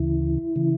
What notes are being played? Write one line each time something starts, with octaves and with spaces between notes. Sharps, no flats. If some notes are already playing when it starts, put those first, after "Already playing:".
Already playing: D2 C#3 E3 E4
C#3 E3